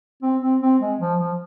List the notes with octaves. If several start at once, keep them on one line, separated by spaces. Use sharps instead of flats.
C4
C4
C4
G#3
F3
F3